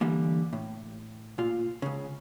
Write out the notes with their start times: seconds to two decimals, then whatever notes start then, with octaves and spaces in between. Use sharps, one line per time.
0.01 D3 E3 G3 A#3
0.53 A2
1.38 A#2 F4
1.82 C#2 C#3